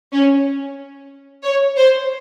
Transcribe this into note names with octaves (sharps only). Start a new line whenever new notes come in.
C#4
C#5
C5